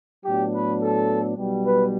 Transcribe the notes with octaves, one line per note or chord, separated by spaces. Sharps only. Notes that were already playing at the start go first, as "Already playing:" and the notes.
A2 F#3 B3 D4 G4
B4
A4
B1 B2 G3
B4